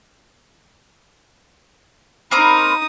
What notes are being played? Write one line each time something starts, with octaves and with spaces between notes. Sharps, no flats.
A#3 C4 D#4 A#4 B5 D#6